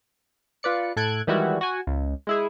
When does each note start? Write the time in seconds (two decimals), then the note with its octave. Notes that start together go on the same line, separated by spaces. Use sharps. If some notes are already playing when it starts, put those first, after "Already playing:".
0.63 F4 B4 D5 C#7
0.96 A2 A4 F#6 G#6 D7
1.27 D#3 E3 G3 G#3 E4 F#4
1.61 F#4 G#5
1.87 C#2
2.27 G#3 E4 G#4